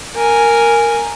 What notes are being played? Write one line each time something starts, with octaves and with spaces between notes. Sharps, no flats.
A#4 G#5